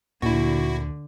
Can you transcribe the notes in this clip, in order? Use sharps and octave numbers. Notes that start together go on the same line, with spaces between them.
D2 A#2 D3 E4 F#4